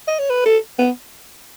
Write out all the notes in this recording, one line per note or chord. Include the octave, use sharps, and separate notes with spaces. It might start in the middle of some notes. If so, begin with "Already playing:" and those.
D#5
C#5
B4
A4
B3